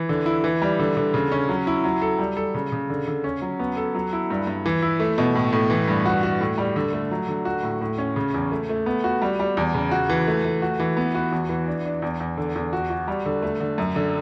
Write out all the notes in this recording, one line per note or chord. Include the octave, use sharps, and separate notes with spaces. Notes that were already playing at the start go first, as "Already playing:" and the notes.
Already playing: E3
D3
E4
E3
G3
D3
D3
C#3
C#4
F#3
E4
F#3
A4
G3
A4
C#3
C#3
D3
D3
C#4
F#3
B3
A4
F#3
E4
G2
G2
E3
E4
A3
B2
A2
A2
E3
G2
F#4
F#4
A2
G3
D3
A3
F#3
D3
F#4
A2
A2
C#4
C#3
E2
A3
A3
B3
F#4
G3
G3
E2
C#3
F#4
E3
A3
A3
F#4
E3
B3
F#4
E2
E3
D4
D4
E2
E2
D3
E2
F#4
F#4
G3
D3
A3
D3
F#2
D3